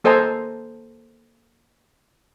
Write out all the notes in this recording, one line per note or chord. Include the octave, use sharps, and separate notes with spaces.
A#3 A4 C5 D#5 G#5 A#5